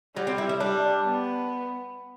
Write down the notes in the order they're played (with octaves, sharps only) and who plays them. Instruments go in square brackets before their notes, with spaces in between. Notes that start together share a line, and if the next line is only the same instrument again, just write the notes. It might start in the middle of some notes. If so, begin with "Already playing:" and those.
[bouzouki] F#3 [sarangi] G3
[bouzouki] C4
E4
E4
[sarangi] G3 [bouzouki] D4
[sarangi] B3